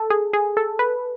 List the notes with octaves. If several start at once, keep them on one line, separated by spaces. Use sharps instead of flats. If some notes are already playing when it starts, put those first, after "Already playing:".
Already playing: A4
G#4
G#4
A4
B4